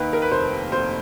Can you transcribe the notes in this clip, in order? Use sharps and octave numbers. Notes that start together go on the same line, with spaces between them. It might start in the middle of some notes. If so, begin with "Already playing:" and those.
Already playing: D#2 D#3 B4
A#4
B4
F1 C5
F1 C5